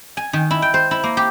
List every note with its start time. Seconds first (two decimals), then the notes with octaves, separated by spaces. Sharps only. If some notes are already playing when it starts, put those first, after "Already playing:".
0.17 G#5
0.33 D#3
0.51 E4
0.62 G5
0.74 C5
0.91 E4
1.03 A#3
1.17 G4